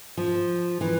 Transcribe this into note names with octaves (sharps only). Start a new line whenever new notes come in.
F3
E3